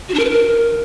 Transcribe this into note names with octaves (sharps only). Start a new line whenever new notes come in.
F#4
D4
A#4
B4
A#4